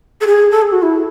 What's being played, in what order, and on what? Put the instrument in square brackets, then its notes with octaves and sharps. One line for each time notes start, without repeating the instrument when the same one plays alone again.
[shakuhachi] A4
G#4
A4
G#4
F#4
E4